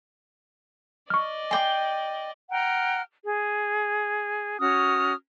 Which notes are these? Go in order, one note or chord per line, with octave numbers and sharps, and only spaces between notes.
D5 D#5 C#6 F6
G5 G#5 C6 D6
F#5 G5 A#5 F6
G#4
C#4 F#4 D#6 F6